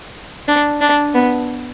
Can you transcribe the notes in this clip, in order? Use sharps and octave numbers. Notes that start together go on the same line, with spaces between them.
D4
D4
B3